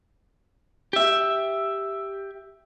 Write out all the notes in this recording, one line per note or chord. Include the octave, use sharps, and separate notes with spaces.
G4 E5